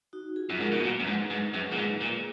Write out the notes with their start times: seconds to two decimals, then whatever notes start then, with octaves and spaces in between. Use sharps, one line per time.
0.13 D#4 F#4
0.36 F4 G#4
0.50 F#2
0.60 G#2 F#4 A#4
0.72 B2
0.83 A#2 G#4 B4
1.00 F#2
1.07 G#2
1.30 G#2
1.54 F#2 G#4 B4
1.72 A#2
1.77 G#2
2.01 A#2